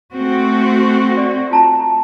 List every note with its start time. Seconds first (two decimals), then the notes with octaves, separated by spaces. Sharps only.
0.12 A3 C4 F#4
1.17 D5
1.51 F4 A5 A#5